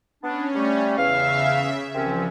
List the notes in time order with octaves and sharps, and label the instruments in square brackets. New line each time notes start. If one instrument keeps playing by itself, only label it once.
[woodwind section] B3 D4 [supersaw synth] C#4
[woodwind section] G3 A3
[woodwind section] E2 F5 [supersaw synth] C#3 E5
[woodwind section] C2 C4 C#4 [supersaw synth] E3 F3